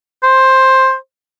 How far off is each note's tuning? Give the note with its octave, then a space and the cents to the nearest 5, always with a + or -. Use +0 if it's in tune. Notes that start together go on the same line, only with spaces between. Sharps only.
C5 +10